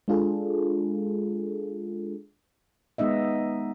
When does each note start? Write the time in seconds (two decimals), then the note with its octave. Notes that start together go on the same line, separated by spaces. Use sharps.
0.08 G#3 D4 F4 G#4 A4
2.98 G#3 B3 D#4 D#5 E5